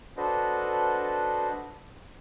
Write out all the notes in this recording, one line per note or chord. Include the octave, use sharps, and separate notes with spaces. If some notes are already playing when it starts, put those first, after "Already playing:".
D4 F#4 A4 B4 C5 D#5